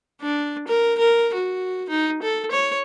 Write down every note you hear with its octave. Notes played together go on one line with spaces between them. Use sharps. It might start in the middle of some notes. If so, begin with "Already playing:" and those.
D4
A#4
A#4
F#4
D#4
A4
C#5